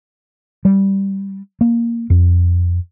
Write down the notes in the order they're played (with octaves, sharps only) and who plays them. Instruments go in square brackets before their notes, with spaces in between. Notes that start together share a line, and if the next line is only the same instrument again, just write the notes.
[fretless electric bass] G3
A#3
F2